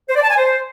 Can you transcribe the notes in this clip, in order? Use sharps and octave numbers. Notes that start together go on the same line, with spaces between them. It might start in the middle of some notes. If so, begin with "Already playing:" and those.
C5
D5
A5
G#5
C5